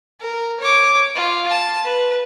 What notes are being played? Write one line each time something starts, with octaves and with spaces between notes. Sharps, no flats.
A#4
C#5 D6
F4
A5
B4